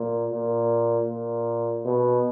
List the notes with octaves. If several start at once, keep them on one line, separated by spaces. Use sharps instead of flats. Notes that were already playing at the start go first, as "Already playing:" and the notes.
Already playing: A#2
A#2
A#2
B2